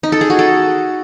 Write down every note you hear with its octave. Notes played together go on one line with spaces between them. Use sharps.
D#4
A4
G#4
F#4
A4